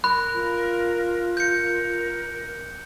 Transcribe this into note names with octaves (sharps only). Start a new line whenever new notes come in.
A#4 B5 F#6
F4
A#4 G6 C#7